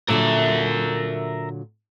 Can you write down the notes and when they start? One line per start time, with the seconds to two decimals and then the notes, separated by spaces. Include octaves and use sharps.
0.08 A#2 D3 F#3 A#4 E5